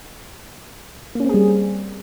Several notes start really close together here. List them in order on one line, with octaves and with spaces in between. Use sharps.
A#3 C#4 C4 G#4 G3